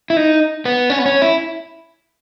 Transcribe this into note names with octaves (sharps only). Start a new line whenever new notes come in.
E4
D#4
B3
C#4
B3
C#4
E4